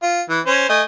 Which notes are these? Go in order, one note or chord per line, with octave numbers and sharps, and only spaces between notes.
F4
E3
C#4 C5
A3 D#5 G#5